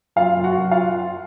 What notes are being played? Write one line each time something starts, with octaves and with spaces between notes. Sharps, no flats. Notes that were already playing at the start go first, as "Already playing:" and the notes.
F#2 F4 F5
F#2
F#4 F#5
F#2
F4 F5